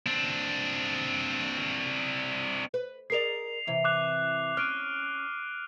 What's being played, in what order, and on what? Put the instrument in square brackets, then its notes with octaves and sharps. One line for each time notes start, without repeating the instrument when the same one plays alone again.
[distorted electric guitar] C4 D4
[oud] B4
[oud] G#4 A#4 D5 [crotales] C7 F7
[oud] C3 E3
[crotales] D6 F#6 F7
[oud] C#4 [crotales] F6 D7 D#7